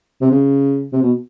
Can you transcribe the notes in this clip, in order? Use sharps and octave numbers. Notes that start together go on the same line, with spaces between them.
C3
C#3
C3
B2